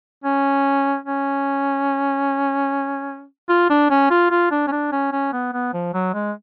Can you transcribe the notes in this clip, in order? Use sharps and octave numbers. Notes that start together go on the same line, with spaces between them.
C#4
C#4
F4
D4
C#4
F4
F4
D4
C#4
D4
C#4
C#4
B3
B3
F3
F#3
G#3